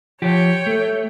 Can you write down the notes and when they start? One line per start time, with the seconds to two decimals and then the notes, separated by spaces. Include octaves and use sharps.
0.22 F3 G4 C#5 G5
0.66 A3